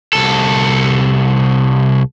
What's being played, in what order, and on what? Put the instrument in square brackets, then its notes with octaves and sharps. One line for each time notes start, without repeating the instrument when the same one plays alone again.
[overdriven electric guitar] C2 A4